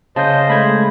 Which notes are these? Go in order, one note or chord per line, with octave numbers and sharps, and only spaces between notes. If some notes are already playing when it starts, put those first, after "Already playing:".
C#3 C5 D#5 A5 G6
G#3 A3 B5 G#6